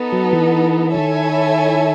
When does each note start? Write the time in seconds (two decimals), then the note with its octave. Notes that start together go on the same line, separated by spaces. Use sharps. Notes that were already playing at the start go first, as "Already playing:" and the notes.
Already playing: B3 D#4 A4
0.12 F#3
0.33 E3
0.95 D#3 E4 A4 C#5 E5 G#5